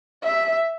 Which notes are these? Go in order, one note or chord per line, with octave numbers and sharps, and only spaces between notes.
E5